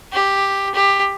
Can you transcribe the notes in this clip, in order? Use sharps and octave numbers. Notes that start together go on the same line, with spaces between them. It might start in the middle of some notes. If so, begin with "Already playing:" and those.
G4
G4